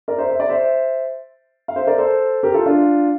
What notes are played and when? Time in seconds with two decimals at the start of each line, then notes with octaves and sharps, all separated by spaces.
0.08 A#4 D5
0.18 C5 E5
0.30 E5
0.40 D5
0.49 C5 E5
1.68 F5
1.76 C5 E5
1.87 A#4 D5
1.98 A4 C5
2.43 G4 A#4
2.54 F4 A4
2.66 D4 F4